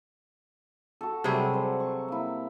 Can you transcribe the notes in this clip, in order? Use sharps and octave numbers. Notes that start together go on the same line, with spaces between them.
F#4 A4
C3 F#3 G3 C4 G#4 A4
C5 F#5
C#6
A#3 E4